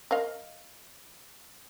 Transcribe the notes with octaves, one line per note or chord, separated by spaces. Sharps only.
A#4 D#5 F5